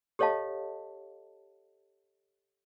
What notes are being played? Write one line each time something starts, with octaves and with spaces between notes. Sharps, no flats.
G4 A4 C#5 D#5 F5 A5